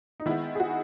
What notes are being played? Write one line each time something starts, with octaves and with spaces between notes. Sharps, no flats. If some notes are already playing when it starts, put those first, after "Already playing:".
D#4
D#3 G#3 B3 E4
G#4
F#4